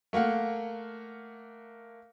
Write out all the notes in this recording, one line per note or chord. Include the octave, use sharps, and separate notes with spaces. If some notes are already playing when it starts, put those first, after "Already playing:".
A3 A#3 F5 F#5